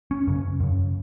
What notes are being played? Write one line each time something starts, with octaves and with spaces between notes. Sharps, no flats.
C#4
F#2 C#3
F#2 C#3